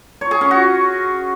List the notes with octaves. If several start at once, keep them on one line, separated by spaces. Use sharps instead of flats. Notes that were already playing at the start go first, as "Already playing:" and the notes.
C#5
G#4
C#4
F#4